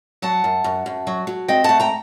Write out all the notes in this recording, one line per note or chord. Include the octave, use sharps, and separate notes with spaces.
F#3 F#5 A5
F#2
F#2
F#2
F#3
F#3
C4 D#5 G5
A3 F#5 A5
G5 A#5